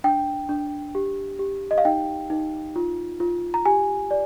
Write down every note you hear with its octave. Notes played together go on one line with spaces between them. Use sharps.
D4 G5
D4
G4
G4
D#5
F5
D#4 G5
D#4
F4
F4
A#5
G4 G#5
D5